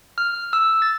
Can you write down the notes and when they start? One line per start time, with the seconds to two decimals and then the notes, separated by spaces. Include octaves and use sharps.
0.18 F6
0.53 E6
0.82 A6